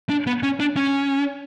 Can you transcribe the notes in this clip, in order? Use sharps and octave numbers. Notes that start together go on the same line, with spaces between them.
D4
B3
C#4
D4
C#4